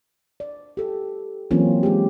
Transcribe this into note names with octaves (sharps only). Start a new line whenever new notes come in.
D5
G4 A4
E3 F#3 A#3 C4 C#4 F4
G#3 G4